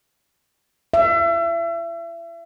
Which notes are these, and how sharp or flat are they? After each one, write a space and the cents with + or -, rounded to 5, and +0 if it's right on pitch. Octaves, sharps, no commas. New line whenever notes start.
E5 +35